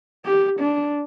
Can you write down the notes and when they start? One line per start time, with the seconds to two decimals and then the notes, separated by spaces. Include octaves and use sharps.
0.25 G4
0.60 D4